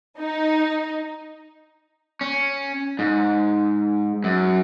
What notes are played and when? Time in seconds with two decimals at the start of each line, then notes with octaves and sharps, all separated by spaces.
0.20 D#4
2.21 C#4
2.99 G#2
4.24 F#2